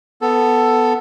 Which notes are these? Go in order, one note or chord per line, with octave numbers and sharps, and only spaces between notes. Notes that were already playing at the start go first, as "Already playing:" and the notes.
B3 A4